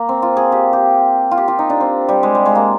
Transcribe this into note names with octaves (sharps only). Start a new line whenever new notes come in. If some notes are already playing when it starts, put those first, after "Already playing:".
Already playing: A#3
C4
F4
G#4
G4
G4
F4
G4
F4
D#4
D4
C4
G3
G#3
G3
G#3
A#3